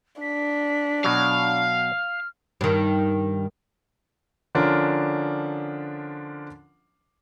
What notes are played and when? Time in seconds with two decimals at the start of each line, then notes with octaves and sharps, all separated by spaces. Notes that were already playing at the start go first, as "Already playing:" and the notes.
0.21 D4 B6
1.04 B2 F#3 F5 F6
2.61 G2 D#3
4.55 D3 F3 C#4 D4 F4 A#4